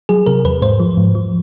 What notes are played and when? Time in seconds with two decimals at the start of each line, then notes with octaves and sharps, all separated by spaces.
0.09 F#3 G#4
0.26 C3 A#4
0.45 E2 B4
0.62 G#2 C5
0.80 F3
0.97 G#2
1.15 F3